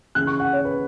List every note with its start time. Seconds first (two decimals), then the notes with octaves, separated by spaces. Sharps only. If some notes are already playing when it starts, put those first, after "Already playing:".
0.15 C#3 E3 C#4 F#6
0.27 C#6
0.40 F#5
0.53 C#5
0.65 B4